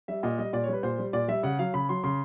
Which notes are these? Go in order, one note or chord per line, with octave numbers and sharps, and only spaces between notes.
G3 E5
A#2 D#5
G3 D#5
A#2 D5
C#5
G3 B4
A#2 C5
G3
A#2 D5
G3 E5
C#3 F#5
F#3 F5
C#3 B5
F#3 C6
C#3 C6